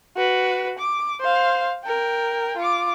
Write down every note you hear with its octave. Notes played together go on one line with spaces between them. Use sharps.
F#4 B4
D6
C5 F5
A#4 G5
F4 D6